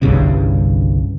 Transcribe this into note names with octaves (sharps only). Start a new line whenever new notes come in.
G1 C2 G2 C#3